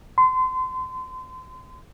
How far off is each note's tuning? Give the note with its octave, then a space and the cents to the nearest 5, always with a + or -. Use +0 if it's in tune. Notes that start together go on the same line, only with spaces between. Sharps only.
C6 -30